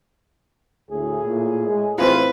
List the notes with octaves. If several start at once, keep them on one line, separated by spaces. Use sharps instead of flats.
D2 A2 G#4
A#2
G#3
A1 C4 E4 F4 B4